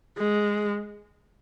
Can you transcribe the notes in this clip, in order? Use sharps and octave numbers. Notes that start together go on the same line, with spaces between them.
G#3